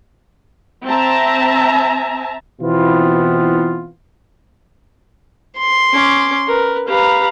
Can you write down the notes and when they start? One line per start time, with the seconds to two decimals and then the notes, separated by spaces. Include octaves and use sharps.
0.86 C4 E5 A5 A#5
2.61 B2 E3 B3 C4 E4 F4
5.57 C6
5.93 C#4 D6
6.47 A#4 B4
6.88 G4 B4 F5 A#5 B5